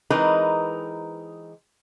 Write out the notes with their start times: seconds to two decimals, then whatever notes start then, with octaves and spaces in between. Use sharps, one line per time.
0.10 E3 G#3 C4 D#4 A#4 B4